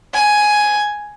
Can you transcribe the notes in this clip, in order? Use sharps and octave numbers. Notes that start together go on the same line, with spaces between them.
G#5